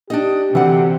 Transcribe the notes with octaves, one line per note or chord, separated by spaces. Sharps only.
D4 D#4 G4 D#5
D2 C3 E3 F#5